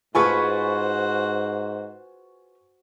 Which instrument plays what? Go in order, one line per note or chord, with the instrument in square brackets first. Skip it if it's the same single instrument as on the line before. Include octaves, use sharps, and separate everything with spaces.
[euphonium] G#2 [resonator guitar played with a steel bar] F4 G#4 B4 [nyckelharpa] F#4 C5 [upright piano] G#5 C#6